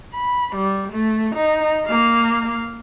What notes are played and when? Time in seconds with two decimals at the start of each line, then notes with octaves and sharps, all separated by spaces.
0.14 B5
0.56 G3
0.92 A3
1.35 D#4
1.86 A#3 F5